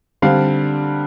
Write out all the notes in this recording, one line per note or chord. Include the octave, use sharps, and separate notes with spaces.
D3 G3 C4 F5